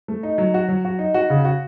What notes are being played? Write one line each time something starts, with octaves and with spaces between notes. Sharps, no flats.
A3
D#4
F#3
F#4
F#3
F#4
D#4
F#4
C#3
F#4